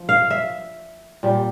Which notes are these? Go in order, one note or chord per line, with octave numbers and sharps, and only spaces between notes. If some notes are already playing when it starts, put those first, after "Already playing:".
Already playing: F3
F5
E5
A#2 G3